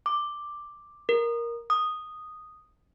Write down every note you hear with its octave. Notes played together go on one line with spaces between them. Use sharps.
D6
A#4
D#6